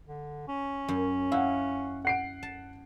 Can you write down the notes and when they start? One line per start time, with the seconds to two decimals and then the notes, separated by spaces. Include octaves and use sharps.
0.08 D3
0.48 C#4
0.88 F#2
1.32 E4 F5 F#5
2.05 F#5 C7 D7
2.43 A5